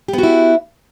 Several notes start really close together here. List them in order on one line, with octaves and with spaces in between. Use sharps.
G4 B3 F#4 E4